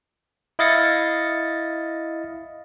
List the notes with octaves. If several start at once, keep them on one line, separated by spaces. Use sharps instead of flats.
E4 D#5 F5 A6 A#6 C#7